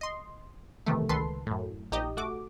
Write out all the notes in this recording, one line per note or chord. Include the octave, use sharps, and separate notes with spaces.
D#5 C6
B1 A2 C3 D#3 E3 A3
C#2 D#3 A4 B4 C6
F#2 A2
A#1 D#4 G4 D#5
A3 F#4 D6